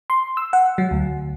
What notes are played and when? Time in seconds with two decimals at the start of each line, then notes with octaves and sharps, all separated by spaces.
0.10 C6
0.37 E6
0.53 F#5
0.78 F#3
0.91 D2